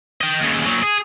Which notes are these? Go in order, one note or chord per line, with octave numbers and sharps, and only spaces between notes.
D#5 G5
D#2 C#3
A#2 F#3
G#4